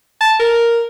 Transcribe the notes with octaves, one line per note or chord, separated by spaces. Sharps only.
A5
A#4